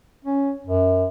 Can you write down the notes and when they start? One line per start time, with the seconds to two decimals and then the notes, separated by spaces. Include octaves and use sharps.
0.25 C#4
0.67 F#2